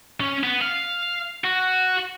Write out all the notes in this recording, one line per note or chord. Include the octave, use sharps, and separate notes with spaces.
C#4
B3
F5
F#4